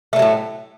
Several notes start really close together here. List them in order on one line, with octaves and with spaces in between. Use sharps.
A3 D3 F#3 A2